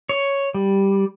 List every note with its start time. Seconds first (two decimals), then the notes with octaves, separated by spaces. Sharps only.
0.09 C#5
0.54 G3